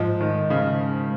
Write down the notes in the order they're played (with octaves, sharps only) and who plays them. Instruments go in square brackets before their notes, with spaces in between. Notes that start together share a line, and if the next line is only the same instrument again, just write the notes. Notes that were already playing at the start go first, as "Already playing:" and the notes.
Already playing: [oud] G#2 [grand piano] F3
[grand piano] D#3
C#3